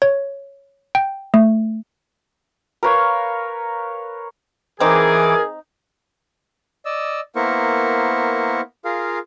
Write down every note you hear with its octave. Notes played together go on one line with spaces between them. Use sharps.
C#5
G5
A3
A#4 B4 C#5 F5
E3 C4 D#4 G#4 A#4 D6 G#6
D5 D#5 E6
A#3 B3 E4 A#4 C5 C#6
F4 G#4 A#4 F5